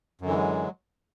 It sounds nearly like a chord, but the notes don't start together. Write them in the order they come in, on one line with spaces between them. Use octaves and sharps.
F#2 D3 E3 G#3 F#3